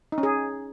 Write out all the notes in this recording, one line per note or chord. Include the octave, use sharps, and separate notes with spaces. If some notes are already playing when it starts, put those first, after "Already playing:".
D#4
C#4
G#4